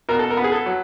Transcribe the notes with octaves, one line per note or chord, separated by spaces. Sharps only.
B2 A#4
A4
A#4
B3
G#4
A4
F#3